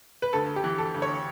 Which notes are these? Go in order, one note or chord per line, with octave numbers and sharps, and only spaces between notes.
B4
D2 A4
G4
E3
A4
D2
C#5